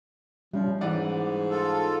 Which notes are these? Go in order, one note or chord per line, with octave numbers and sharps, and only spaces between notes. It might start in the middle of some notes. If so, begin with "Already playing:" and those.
F3 G3 C#4
G#2 E3 D5 F#5
F4 A4